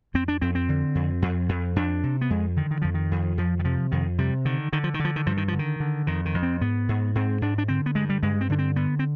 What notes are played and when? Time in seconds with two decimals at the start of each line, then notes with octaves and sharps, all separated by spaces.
0.14 F2 C4
0.28 D4
0.41 F2 C4
0.55 C4
0.69 D3
0.95 F2
1.22 F2
1.49 F2
1.76 F2 D4
2.03 C3
2.21 B3
2.30 F2 G#3
2.56 D3 D#3
2.71 D#3
2.82 F2 F3
2.94 D#3
3.11 F2
3.38 F2 F3
3.59 D#3
3.65 C3 F3
3.92 F2 D#3
4.18 C3 G3
4.45 D3 D#3
4.73 D3 D#3
4.84 F3
4.94 D#3
5.00 D3 F3
5.16 D#3
5.26 G2 F3
5.37 D#3
5.48 D3 F3
5.59 D#3
5.80 D3
6.07 F2 D#3
6.25 D#3
6.34 F2
6.43 C4
6.61 G#2 B3
6.89 G#2
7.15 G#2 C4
7.41 G#2 D4
7.58 D4
7.68 D3 C4
7.86 B3
7.95 G2 G#3
8.09 G3
8.23 G2 G#3
8.41 C4
8.50 D3 D4
8.59 C4
8.76 D3 B3
8.99 C4